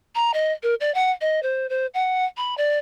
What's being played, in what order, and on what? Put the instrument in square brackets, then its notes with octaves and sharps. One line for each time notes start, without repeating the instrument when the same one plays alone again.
[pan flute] A#5
D#5
A#4
D5
F#5
D#5
C5
C5
F#5
B5
D5